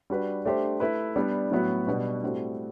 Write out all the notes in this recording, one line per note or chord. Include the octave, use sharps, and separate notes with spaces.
G3 D4 F#4 B4
A3 D4 G4 C5
A3 E4 B4
G3 B3 D4
A2 F#3 B3 F#4
B2 G3 D4 F#4 B4
A2 G3 C4 F#4 A4